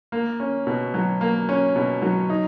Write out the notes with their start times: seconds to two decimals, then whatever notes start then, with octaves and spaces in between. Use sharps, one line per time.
0.12 A#3
0.40 C#4
0.67 B2
0.94 F#3
1.21 A#3
1.49 C#4
1.76 B2
2.02 F#3
2.30 D#4